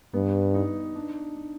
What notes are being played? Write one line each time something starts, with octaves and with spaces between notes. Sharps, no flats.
G2 B3
D#4
D4
D4